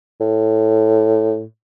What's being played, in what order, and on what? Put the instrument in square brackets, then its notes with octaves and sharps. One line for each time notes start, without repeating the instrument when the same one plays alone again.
[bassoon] A2